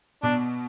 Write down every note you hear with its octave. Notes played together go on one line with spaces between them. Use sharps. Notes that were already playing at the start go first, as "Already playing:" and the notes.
B2 D4